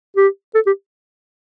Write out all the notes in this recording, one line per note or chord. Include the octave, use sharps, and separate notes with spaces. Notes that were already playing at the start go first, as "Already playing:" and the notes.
G4
A4
G4